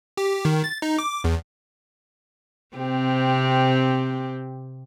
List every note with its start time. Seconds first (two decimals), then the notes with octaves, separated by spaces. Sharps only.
0.17 G4
0.45 D#3
0.64 A6
0.82 D#4
0.99 D6
1.24 E2
2.76 C3 C4 G4